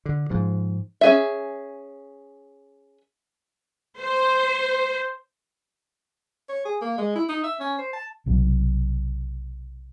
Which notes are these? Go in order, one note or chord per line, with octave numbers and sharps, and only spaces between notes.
D3
G#2 F3
C#4 G#4 E5
C5
C#5
G#4
A#3
G#3
E4
D#4
E5
C#4
C5
A5
B1 C3 F#3